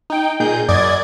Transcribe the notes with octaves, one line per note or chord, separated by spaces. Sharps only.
D#4 G5
A#2 D#4 G#4 G6
F#2 D5 D#5 G#6